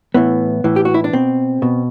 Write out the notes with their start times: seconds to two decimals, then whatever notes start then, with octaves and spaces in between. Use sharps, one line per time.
0.14 A2 E3 B3
0.64 A2 E3
0.76 G4
0.85 F#4
0.94 E4
1.04 D4
1.13 B2 C4
1.62 B2